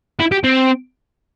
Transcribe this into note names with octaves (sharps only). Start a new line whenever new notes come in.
E4
G4
C4